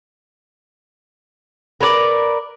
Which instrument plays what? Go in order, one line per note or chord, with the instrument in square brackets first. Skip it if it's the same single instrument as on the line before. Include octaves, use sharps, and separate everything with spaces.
[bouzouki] A#4 B4 C#5 D5